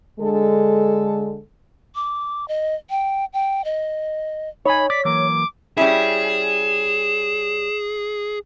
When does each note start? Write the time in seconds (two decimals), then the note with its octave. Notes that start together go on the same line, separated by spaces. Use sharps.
0.20 D3 G#3 A4
1.95 D6
2.48 D#5
2.90 G5
3.33 G5
3.65 D#5
4.66 D#4 C#5 G#5 B5
4.90 D5 B6
5.05 E3 F#3 A#3 D6
5.77 G3 C#4 E4 G#4 E7